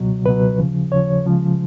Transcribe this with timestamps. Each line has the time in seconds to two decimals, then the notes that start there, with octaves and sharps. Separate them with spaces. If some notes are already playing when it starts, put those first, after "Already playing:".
Already playing: C#2 B2 F#3
0.26 C#2 B2 F#3 B4
0.59 D#2 C#3 F3
0.92 D#2 C#3 F3 C#5
1.25 C#2 C#3 F3 G#3